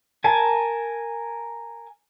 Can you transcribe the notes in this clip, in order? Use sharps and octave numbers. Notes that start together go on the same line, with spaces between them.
A#4 G#5 A5